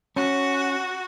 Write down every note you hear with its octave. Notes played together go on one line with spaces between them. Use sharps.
C#4 F#4